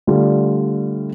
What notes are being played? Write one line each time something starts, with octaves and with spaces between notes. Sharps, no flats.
D3 G3 A3 F4